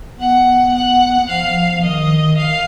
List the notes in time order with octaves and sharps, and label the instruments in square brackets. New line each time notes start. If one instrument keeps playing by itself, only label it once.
[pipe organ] B3 [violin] F#5
[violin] F#5
[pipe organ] F3 [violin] F5
[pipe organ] D#3 [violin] D#5
[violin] F5